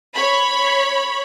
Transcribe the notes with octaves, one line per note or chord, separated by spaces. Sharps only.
C#5 B5